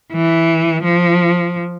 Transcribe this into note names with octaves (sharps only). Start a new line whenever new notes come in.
E3
F3